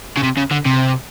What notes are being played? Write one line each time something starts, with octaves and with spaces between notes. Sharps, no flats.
C#3
C3
C#3
D3
C3